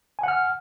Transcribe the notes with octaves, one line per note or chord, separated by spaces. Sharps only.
F#5 G#5 F6